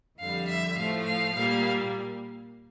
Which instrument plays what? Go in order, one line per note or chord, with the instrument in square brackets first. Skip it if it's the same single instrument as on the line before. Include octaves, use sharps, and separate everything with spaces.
[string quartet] F2 D3 G3 F5
E5
A2 F3 A3 F5
F5
A#2 G3 A#3 F5